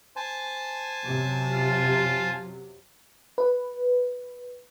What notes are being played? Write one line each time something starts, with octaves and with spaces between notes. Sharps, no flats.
C5 G#5 A5
F#2 C3 F#3
F4
B4